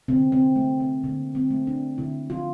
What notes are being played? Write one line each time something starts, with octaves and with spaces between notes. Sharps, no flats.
D3 C4
C4
A3
C4
D3 A#3
C4
A3
D4
D3 E4
F4